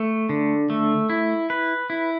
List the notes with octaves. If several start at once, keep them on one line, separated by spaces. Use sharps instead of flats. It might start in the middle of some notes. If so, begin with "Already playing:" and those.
Already playing: A3
D3
A3
E4
B4
E4